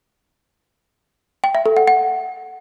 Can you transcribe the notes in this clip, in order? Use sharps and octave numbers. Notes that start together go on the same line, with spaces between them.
G5
E5
A4
F#5
F#5